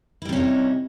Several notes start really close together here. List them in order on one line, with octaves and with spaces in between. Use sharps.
E4 G3 C3 C#4 D#4